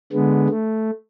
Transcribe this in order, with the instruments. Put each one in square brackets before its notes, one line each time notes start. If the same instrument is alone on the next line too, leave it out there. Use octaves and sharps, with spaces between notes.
[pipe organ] D3 G#3 B3
A3